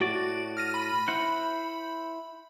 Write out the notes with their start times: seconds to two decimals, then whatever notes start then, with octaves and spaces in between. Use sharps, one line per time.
0.01 A2 F#4 D5
0.57 F6 A#6 D#7
0.74 B5
1.08 E4 C5 F#5